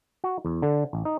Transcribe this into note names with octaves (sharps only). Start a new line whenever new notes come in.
F#4
E2
D3
A1
D#4